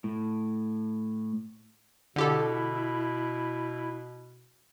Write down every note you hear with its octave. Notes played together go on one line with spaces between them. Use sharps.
A2
B2 D3 E4 G4 A4